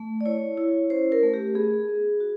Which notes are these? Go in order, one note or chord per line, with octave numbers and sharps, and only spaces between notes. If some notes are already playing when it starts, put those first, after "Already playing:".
Already playing: A3
D5
E4 C#5
E4
C#4 C5
A#4
A3
G4
B3 G#4
B3
F#4